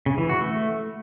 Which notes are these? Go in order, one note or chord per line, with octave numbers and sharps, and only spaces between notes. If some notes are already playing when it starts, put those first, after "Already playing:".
C#3
E3
F#4
A3